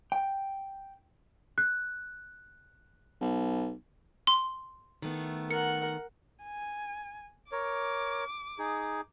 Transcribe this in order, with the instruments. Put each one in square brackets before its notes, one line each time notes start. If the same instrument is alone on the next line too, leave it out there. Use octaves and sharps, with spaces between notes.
[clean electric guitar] G5
[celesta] F#6
[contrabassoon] B1
[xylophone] C6
[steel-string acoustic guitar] D#3 A3 B3
[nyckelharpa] A#4 F#5 [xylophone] C#7
[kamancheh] G#5
[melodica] A#4 C#5 [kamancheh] D6
[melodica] D#4 G#4